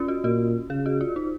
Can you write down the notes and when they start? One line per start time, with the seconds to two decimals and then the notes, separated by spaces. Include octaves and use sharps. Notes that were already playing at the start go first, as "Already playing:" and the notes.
Already playing: C#4 F4
0.08 F#4
0.24 A#2 F#4
0.70 C#3 G#4
0.86 F#4
1.01 F4
1.16 D#4